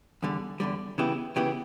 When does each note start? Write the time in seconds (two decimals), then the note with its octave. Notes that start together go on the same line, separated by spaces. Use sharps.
0.23 E2 D3 G3
0.60 E2 D3 G3
0.98 C#3 E3 B3 E4 G4
1.36 C#3 E3 B3 E4 G4